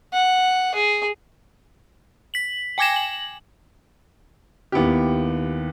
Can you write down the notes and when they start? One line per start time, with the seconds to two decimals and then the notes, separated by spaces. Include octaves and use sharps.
0.13 F#5
0.75 G#4
2.34 B6 F#7
2.78 G5 G#5 D6 G#6 A#6 E7
2.96 F#7
4.72 D#2 B3 E4 G4